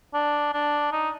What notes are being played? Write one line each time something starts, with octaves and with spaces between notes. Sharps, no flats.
D4
D4
D#4